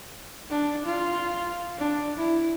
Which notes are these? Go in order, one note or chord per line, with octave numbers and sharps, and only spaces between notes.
D4
F4
D4
E4